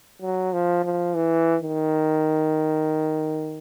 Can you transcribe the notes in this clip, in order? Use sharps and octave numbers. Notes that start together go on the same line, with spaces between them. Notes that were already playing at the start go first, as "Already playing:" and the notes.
F#3
F3
F3
E3
D#3